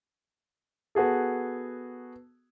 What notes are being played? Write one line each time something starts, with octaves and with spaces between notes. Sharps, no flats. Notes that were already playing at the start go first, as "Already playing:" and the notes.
B3 F#4 G#4 A4